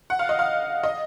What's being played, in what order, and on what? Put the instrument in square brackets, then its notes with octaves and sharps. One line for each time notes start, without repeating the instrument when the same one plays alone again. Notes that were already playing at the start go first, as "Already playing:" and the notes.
[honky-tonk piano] F#5
F5
D#5
F5
D#5